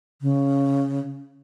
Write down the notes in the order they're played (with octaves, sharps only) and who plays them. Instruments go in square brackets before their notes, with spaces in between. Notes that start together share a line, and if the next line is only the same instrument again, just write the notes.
[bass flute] C#3